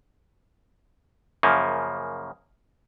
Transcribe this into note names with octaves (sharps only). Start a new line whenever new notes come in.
F#2 C#3 F3 A#3